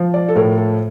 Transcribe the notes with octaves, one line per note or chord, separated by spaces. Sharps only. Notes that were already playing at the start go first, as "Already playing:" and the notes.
Already playing: F3
D5
A4
A2 A#4
A4